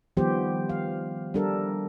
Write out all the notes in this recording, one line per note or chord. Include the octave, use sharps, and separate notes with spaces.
D#3 F3 G3 B3 G4 C5
F5
G3 D4 A4 A#4